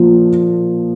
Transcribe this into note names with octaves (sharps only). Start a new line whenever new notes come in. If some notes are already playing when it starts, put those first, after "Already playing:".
Already playing: A#2 F3